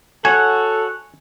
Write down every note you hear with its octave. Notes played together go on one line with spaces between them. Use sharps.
F#4 A4 C#5 F#5 G#5